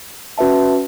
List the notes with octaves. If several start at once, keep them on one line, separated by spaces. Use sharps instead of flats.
C#4 F#4 B4 E5 A5